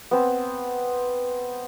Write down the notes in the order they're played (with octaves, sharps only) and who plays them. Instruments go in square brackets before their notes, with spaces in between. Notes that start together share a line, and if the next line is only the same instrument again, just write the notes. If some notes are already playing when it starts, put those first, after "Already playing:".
[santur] B3 C4